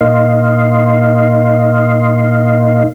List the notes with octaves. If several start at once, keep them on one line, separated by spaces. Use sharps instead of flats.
A#2 A#3 D#4 D#5 F5 C6